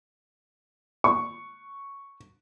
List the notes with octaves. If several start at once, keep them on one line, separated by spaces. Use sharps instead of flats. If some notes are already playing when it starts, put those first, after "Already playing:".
C#6